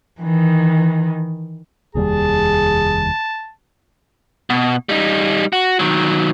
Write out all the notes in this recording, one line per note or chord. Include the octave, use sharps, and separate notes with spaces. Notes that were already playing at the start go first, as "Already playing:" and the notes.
D#3 E3
F1 D#2 G3 G#4 A5
B2
G3 D#4
F#4
D#3 F#3